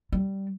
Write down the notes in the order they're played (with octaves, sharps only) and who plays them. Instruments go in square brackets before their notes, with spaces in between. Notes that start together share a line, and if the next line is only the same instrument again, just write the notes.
[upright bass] G3